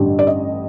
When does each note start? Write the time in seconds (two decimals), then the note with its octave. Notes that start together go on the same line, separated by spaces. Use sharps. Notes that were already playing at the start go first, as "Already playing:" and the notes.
Already playing: A1 G2 D3 G3 D4
0.19 D5
0.27 D#5